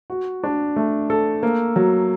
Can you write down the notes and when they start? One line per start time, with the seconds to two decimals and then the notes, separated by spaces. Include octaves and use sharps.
0.10 F#4
0.44 D4
0.76 A3
1.10 A4
1.43 A#3
1.76 F#3